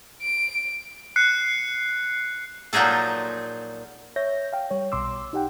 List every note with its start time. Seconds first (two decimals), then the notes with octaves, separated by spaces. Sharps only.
0.22 D7
1.16 F#6 C7 C#7
2.73 A#2 F3 F#3 D#4 G#4 A4
4.16 C#5 E5 G6 A#6
4.53 F5 G5
4.71 G3 C#5
4.92 B1 B2 C6 D6 E6
5.33 D#4 G4 F#5 G5